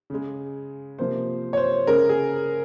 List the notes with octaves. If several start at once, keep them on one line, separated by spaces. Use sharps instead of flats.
C#3 G#3
C3 F3 A#3 C5
C#5
C5
C#3 G#3 A#4
G#4